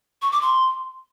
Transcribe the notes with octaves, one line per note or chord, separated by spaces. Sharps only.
C#6
D6
C6